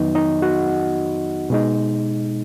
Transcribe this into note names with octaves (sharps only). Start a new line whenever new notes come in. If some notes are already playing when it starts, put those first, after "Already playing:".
Already playing: F2 D#3 F#3 B3 D#4
D#4 D#5
F#4 F#5
B2 G#3 D#4